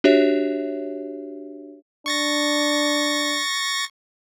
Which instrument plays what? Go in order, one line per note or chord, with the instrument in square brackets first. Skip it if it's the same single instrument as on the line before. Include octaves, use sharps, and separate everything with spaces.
[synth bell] D4 F#4 G4 C#5 E5
[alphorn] D4 [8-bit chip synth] C#6 A6 A#6